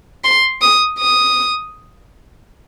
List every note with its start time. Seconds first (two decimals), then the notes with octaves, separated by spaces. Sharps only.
0.24 C6
0.62 D#6
0.99 D#6